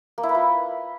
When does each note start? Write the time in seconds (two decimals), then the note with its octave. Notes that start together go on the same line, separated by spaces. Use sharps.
0.18 A#3
0.23 E4
0.29 B4
0.35 F4